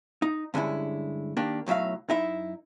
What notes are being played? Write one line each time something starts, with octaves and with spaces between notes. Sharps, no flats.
D#4
G2 D3 G#3 C#4 E4
D#3 A#3 D4 G4
B1 A2 F#3 E5 F5
F#2 D#4 E4 E5